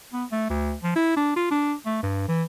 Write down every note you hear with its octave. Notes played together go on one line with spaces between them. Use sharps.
B3
A3
D2
F3
E4
D4
F4
D4
A3
G2
E3